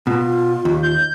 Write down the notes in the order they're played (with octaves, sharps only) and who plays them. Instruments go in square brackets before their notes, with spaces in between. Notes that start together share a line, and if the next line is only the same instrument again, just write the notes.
[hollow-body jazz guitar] B2 [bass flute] F4
[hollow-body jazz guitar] D#2
[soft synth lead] G6